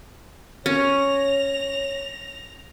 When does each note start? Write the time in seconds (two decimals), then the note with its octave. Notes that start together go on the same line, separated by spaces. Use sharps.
0.66 C#4 C#5 A#6 F7